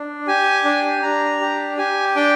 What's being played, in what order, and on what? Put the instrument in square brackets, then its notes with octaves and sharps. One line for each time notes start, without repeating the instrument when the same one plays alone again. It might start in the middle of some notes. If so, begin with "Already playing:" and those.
Already playing: [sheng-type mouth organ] D4
G4 G#5
D4
D4 A#5
G4
G4 G#5
D4 G5